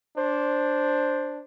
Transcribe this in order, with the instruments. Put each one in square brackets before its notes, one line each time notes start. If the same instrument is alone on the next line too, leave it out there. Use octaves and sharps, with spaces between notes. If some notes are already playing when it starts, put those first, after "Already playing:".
[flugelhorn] D4 [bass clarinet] C5